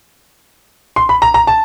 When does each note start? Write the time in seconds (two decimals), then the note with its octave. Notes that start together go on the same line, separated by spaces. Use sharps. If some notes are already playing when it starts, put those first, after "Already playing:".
0.96 C6
1.09 B5
1.22 A#5
1.34 A#5
1.47 A5